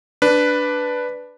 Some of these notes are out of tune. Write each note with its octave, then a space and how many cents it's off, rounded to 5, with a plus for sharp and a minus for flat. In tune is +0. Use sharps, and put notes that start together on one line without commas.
D4 +0 B4 +0